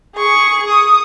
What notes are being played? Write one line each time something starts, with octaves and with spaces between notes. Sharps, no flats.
G#4 C#6
D#6